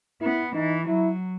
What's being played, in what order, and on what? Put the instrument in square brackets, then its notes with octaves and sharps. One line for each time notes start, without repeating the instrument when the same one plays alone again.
[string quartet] B3 [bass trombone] E4
[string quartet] E3 [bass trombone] D#4
[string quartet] F#3 [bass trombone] E4